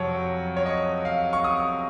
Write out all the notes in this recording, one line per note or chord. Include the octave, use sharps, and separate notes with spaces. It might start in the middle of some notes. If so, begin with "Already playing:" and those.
Already playing: F2 C3 F#3 C#5
C#5
D#5
F5
C#6
D#6